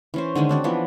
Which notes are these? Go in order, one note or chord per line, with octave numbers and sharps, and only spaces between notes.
E3 C#4 C5
D3 D#3 G#3 C#4
C4 D4 F#4
E3 F3 B3